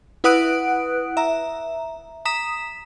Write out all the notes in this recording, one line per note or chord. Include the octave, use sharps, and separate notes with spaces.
E4 B4 F#5 D#6 F#6 D7
E5 A#5
A#5 D#6 B6 E7